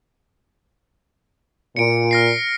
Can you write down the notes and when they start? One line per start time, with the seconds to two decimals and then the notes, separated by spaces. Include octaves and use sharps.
1.76 A#2 C#7 D7
2.11 F6 A#6 C7